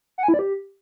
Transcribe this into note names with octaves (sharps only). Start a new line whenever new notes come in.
F#5
G#5
E4
D5
G4